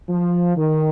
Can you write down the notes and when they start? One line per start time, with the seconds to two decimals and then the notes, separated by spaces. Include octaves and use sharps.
0.09 F3
0.57 D#3